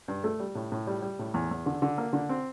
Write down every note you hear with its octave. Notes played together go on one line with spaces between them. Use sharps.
G2
A3
G3
A2
A2
G3
G3
A2
E2
E2
D3
D3
A#3
D3
C4